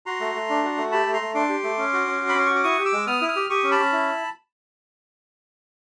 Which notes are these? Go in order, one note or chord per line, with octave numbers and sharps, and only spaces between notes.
F#4 A#5 C6
A3
A3
D4
F#4
A3
G4 A5 B5
A3
A#5 C6
A3
D4 C6 D6
G4
A3
C#4
F#4
C#4
F#4
B5
C#4 C6
F#4 C#6
D6
E4 C#6 D#6
G4
D6 E6
G#3
B3 D#6 F6
E4
D#6 F6
G4
G4 C#6 D#6
C#4
A5 B5
C#4
E4